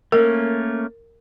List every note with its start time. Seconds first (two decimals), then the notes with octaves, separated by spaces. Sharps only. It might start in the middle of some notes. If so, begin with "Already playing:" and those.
0.12 A3 A#3 C#4 A#4